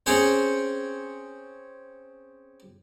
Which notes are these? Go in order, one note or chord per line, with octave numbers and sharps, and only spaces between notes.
C4 C#4 G#4 C5 C#5